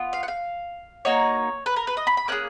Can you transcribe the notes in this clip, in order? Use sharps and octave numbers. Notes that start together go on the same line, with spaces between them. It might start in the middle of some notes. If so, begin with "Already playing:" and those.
Already playing: B3 F4
F5
F#5
F5
A#3 D#4 F#4 C#5
B4
A#4
B4
D#5
B5
B5
A#3 C#4 G#4 F#6